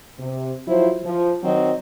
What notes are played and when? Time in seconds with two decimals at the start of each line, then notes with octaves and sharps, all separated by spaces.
0.19 C3
0.68 F3 F#3 E4 F4 C5
1.04 F3
1.43 D#3 F#3 C4 F#4 D#5